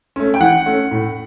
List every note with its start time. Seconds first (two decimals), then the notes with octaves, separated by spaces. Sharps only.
0.16 A3 C#4
0.34 G5
0.40 E3 F#5
0.66 A3 C#4
0.91 A2